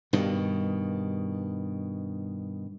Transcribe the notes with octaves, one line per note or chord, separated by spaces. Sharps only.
G2 B2 D#3